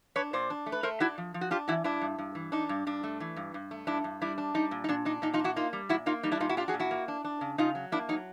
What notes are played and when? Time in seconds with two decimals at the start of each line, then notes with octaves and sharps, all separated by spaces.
0.16 D4 B4 C#5
0.33 A#2 C5 D5
0.50 D4
0.66 A3
0.72 B4
0.83 A3 A#4 C5
1.00 D4 E4 F#4
1.18 F3
1.34 F3
1.41 F#4
1.51 D4 F4 G4
1.68 E3 E4 F#4
1.84 G2 D4 E4
2.01 G2
2.18 G2
2.35 E3
2.52 D4 D#4
2.69 G2
2.87 G2 D4
3.03 A3
3.20 E3
3.36 G2
3.54 G2
3.71 A3
3.87 G2 D4 E4
4.04 G2
4.21 G3 D4 E4
4.38 D4
4.54 G3 D#4
4.71 A#2
4.84 D#4
4.88 A#2 D4
5.05 D4 D#4
5.22 A#2 D#4
5.33 D#4 F4
5.39 D4
5.44 E4 F#4
5.56 A#3 D#4 F4
5.73 G3
5.89 A#2 E4 F#4
6.06 A#3 D#4 F4
6.23 G3 D#4
6.32 D4 E4
6.40 A#2 D#4 F4
6.49 E4 F#4
6.57 D4 F4 G4
6.68 F#4 G#4
6.74 A#2
6.80 E4 F#4
6.91 A#3
7.08 D4
7.24 D4
7.41 C#3
7.58 C#3 D#4 F4
7.75 F#3
7.92 A#3 D4 E4
8.09 F#3 D#4